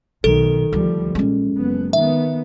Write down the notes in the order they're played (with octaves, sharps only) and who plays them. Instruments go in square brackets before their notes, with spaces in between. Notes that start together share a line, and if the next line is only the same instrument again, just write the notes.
[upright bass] B1 [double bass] D#3 [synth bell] A4
[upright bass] D2 [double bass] F3 G3
[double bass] A#1 [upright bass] G#3 C#4
[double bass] F#1 B3
[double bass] D#3 B3 [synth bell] E5